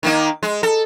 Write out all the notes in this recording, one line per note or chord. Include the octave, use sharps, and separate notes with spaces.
D#3 A#3 D#4
G#3
A4